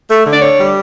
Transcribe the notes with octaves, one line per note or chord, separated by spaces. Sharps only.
A3
D3
D5
D4 C#5
G3